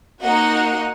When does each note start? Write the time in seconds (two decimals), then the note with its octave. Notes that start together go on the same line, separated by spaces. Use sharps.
0.22 A#3 D#4 F#4 D#5 F#5